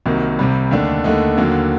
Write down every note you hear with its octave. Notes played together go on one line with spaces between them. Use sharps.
C2 C3 D#3 F#3 A#3
C2 C3 G3
D#2 D3 A3 D4
D#2 D3 A3 D#4
D#2 D3 F#3 A#3